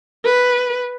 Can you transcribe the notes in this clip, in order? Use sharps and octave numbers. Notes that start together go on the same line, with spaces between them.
B4